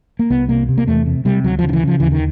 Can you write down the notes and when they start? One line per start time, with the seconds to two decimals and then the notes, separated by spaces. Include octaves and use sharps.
0.19 A#3
0.30 C2 B3
0.48 C3 A#3
0.69 C3
0.78 A#3
0.87 E2 A3
1.06 C3
1.25 C3 G3
1.44 D2 F#3
1.59 C#3 F3
1.69 D#3
1.73 E3
1.83 C#3 F3
2.00 D#2 E3
2.12 D#3